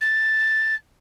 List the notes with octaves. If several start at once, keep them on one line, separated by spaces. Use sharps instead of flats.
A6